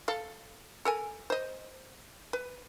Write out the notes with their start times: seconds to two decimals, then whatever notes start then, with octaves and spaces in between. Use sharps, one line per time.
0.08 A4 F5
0.85 A4 A#4 G#5
1.30 C5 D#5
2.33 B4